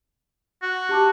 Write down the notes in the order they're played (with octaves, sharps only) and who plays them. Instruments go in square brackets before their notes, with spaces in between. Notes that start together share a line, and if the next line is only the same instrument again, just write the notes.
[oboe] F#4
[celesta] G4 A5 D6